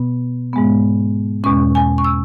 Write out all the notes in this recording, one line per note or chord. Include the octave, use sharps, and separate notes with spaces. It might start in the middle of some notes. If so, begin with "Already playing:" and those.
Already playing: B2 B3
G#2 G#3 B3
E2 B2 G#3 C#4 C#6
G#5
C#6
E6